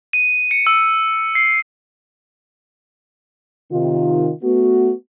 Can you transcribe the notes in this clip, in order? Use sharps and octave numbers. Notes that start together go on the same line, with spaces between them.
D#7
C#7
E6
C7
C3 D#3 F4
A3 B3 F#4